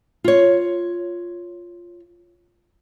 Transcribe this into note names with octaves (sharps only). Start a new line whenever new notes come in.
F4 C#5